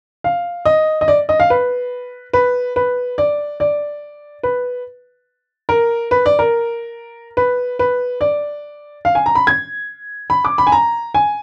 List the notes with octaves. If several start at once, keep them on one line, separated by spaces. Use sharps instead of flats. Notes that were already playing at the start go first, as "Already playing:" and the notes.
F5
D#5
D#5
D5
D#5
F5
B4
B4
B4
D5
D5
B4
A#4
B4
D5
A#4
B4
B4
D5
F5
G#5
A#5
B5
G#6
B5
D6
B5
G#5
A#5
G#5